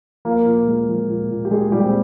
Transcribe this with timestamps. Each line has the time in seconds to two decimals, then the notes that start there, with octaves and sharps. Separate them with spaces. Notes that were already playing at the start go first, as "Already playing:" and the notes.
0.25 F3 A#3 A#4
0.46 A#2
0.68 G#3
0.89 F3
1.09 A#2
1.30 A#2
1.45 G4
1.51 G#3 G#4
1.72 A#2 G3 G4
1.84 C4